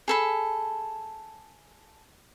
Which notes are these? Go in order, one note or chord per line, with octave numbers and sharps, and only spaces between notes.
G#4 A4 B5